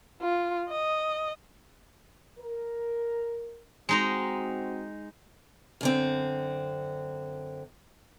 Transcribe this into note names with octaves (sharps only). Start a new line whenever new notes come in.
F4
D#5
A#4
G#3 C4 D#4 F#4 A#5
F#2 D3 C4